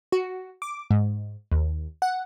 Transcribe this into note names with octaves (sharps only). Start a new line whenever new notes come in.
F#4
D6
G#2
D#2
F#5